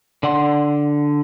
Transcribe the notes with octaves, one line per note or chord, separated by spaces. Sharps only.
D3 D5 F#5 C6